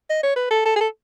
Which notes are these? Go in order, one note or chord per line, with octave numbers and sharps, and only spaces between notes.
D#5
C#5
B4
A4
A4
G#4
A4